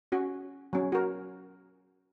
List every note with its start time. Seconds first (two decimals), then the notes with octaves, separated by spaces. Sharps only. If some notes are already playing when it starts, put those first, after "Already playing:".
0.12 C#4 F#4
0.73 F#3 C#4
0.92 F#4 A#4